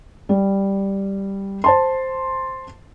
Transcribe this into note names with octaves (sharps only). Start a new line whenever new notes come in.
G3
C5 A5 C6